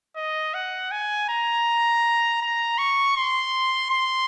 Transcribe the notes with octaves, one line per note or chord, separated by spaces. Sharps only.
D#5
F#5
G#5
A#5
A#5
C#6
C6
C6